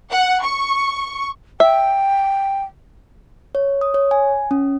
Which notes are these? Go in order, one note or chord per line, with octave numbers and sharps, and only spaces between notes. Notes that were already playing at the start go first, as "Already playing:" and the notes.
F#5
C#6
E5 G5
C#5
D#6
C#5
G#5
C#4